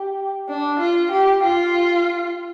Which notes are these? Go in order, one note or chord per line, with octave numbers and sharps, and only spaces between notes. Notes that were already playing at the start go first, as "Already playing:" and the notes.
Already playing: G4
D4
F4
G4
F4